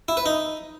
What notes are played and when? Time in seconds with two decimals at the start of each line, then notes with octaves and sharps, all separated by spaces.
0.08 E4
0.17 B4
0.26 D#4